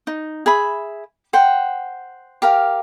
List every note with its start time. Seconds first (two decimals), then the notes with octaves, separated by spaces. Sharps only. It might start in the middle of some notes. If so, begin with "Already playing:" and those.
0.07 D#4
0.46 G#4 E5 B5
1.33 C5 F#5 G5
2.42 G4 A#4 F5